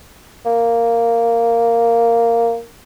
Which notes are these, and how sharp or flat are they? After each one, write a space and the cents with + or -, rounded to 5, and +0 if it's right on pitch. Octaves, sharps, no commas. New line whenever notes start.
A#3 -5